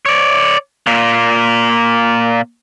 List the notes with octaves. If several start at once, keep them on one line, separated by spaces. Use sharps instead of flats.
C#5 D5
A#2 A#3